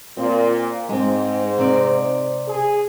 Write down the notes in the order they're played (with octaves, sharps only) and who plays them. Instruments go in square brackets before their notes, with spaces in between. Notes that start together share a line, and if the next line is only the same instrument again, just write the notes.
[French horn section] A#2 [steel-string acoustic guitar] C4
[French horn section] G#2 [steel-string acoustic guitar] G#3 C4
[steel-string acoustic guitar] C3 C4 D5
[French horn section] G#4